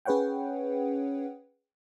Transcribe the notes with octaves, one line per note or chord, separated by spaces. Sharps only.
C#4 G#4 B4 C#5 F#5 G5